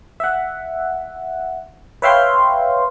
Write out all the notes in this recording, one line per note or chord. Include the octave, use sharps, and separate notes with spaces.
E5 F#5
B4 C#5 E5 F5 G5 C6